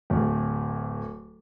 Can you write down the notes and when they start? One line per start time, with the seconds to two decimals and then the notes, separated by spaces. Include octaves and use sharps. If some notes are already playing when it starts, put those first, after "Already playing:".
0.10 D1 D2